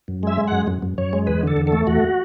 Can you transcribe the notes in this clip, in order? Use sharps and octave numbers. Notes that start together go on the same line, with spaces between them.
F#2
G#3 E5
G#3
F#2 F#5
F#2
F#2
F#2 C#5
G#3
E2 B4
D3 A4
E2
A4
A3
E2 F#4